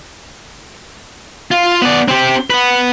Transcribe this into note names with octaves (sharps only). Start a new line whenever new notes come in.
F4 F5
B3 D5
C4 G4
B3 B4